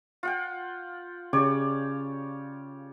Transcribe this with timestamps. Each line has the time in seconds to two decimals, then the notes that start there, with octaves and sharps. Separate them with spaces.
0.23 F4 F#5 G5
1.33 C#3 G4 C#5 D5